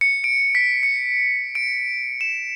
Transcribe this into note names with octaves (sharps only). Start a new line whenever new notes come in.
C#7
D7
B6
C#7
D7
E7